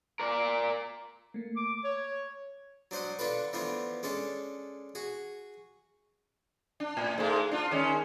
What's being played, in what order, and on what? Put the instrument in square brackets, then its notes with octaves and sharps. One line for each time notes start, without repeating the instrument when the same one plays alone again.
[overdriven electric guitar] A#4 D5
[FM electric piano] A3 A#3
[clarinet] D6
C#5
[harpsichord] F#3 D4 C5 F#5 D#6
D3 D4 F4 A4 B4
E3 F3 A3 B3 D4 F4
G#3 C#4 D4 A4
F#4 G#4
[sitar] D4
A2
G#2 G#3 A3
D4 F4
D#3 G#3 C#4